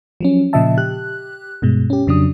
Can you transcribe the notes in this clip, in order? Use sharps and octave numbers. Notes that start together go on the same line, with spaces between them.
F3 F#3 C#4
A#2 C#3 F3 D#5 E5 A5
G4 F#6
G2 B2 G#3
C#4 G4
F2 C#3 F#3 D4 D#6